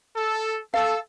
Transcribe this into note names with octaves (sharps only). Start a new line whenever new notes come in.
A4
A4 F5